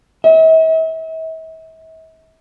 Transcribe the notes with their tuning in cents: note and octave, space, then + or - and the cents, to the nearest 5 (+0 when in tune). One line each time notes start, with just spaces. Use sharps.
E5 -40